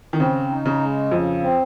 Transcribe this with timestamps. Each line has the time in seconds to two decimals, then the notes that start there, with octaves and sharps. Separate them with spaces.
0.13 D#3
0.19 C#3 C4
0.50 D#4
0.65 C#3
0.81 G#3
1.11 F2 C#3
1.43 C4